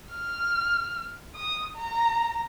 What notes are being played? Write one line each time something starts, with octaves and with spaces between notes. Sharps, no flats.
F6
D#6
A#5